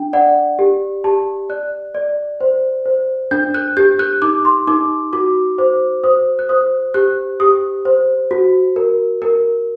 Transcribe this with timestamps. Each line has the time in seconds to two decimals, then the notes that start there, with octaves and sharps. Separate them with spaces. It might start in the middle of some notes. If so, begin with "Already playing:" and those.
Already playing: D4 G5
0.13 D5 F#5
0.59 G4
1.04 G4 A5
1.49 D5 F#6
1.95 D5
2.41 C5
2.85 C5
3.31 D4 G6
3.54 F#6
3.77 G4 G6
3.99 F#6
4.22 D#4 D6
4.45 C6
4.67 D#4 D6
5.13 F#4 D6
5.58 C5 D6
6.04 C5 D#6
6.39 F#6
6.49 C5 D#6
6.94 G4 F#6
7.40 G4 D#6
7.85 C5
8.31 F#4
8.76 A#4
9.22 A#4